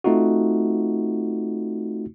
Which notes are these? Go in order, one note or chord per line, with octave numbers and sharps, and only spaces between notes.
A3 C4 D#4 F4 F#4